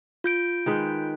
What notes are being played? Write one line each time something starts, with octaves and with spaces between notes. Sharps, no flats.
F4 G6 D7
D#3 G#3 B4